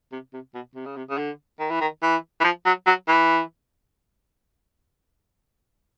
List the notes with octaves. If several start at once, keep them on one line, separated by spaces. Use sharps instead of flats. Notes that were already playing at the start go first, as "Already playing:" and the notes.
C3
C3
B2
C3
C#3
C3
C#3
D3
D#3
E3
D#3
E3
E3
F3
F#3
F#3
E3